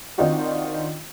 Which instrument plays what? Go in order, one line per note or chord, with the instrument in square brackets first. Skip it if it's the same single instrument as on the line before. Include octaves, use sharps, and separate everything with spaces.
[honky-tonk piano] D#3 C4 D4 D#4 F4 F#4